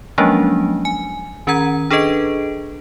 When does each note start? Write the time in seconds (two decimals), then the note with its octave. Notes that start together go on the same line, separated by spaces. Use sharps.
0.18 F3 F#3 G#3 A#3 C#4 D4
0.85 G#5
1.47 D#3 C#4 A#4 F#5 A#5 G#6
1.90 D4 G#4 A4 B4 D#5 D7